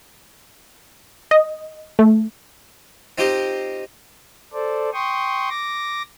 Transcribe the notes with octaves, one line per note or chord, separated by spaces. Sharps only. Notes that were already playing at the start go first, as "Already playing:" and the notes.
D#5
A3
C4 D#4 F4 G4 C5 D#5
A4 C5 D5
G5 C6 C#6 D#6
D6 A#6